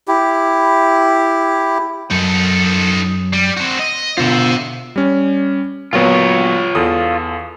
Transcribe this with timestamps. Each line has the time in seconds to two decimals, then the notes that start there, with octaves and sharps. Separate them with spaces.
0.08 E4 G4
2.11 F#2 D#4 A4
3.33 G3
3.57 C4 F#4
3.79 D#5
4.18 B2 D3 F4 C5 E5
4.96 G3 C#4
5.93 A#2 F#3 B3 F4 C#5
6.75 E2 A4 D#6